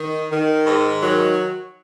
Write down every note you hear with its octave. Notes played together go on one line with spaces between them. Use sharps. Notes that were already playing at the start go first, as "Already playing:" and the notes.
Already playing: D#3
D#3
G#2
D#3 F#3